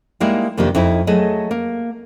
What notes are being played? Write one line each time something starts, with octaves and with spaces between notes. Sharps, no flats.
G3 G#3 A#3 D#4 E4
F2 C3 D#3 A#3 D4 G4
F2 D#4 E4
F#3 A3 G#4 A4 D#5
A#3